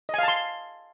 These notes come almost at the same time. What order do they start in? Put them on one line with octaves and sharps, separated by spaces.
D#5 G#5 F5 A5 C6